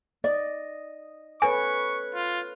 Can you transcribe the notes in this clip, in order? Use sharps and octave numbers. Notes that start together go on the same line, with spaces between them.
D5 D#5
A4 B4 C#5 G#5 C#6
F4